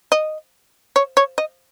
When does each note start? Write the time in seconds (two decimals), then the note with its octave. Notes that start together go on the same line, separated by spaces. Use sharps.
0.12 D#5
0.96 C#5
1.17 C#5
1.38 D#5